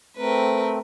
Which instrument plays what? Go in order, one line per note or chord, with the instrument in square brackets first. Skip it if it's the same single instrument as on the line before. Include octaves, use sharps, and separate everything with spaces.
[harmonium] A3 C4 [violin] A#4 B4